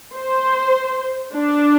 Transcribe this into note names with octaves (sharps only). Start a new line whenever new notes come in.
C5
D4